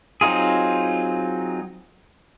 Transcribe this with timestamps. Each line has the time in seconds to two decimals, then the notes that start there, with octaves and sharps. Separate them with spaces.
0.21 F#3 C4 D#4 F4 G#4